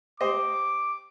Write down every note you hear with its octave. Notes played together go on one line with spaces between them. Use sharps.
G4 C5 D#5 D6